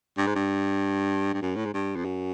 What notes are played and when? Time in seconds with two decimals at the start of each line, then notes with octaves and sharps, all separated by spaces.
0.17 G2
0.27 G#2
0.35 G2
1.34 G2
1.42 F#2
1.56 A2
1.65 G#2
1.73 G2
1.96 F2
2.05 F#2